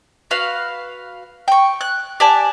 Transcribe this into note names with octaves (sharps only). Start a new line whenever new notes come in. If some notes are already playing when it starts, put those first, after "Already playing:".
F#4 B4 F5
G5 C#6
F#6
G4 D5 G#5 A5